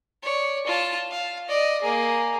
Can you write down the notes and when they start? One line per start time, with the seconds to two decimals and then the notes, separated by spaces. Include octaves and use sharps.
0.23 C#5 D5
0.67 F4 A5
1.11 F5
1.48 D5 D#5
1.82 A#3 G#4